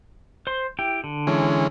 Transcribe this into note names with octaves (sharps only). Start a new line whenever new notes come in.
C5 C6
E4 G4 G5
D3
E3 G#3 C#4